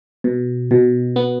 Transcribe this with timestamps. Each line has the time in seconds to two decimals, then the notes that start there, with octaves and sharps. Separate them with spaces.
0.24 B2
0.71 B2
1.16 B3